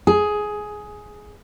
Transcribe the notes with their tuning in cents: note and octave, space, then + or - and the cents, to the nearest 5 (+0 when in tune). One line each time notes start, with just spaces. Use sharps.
G#4 +10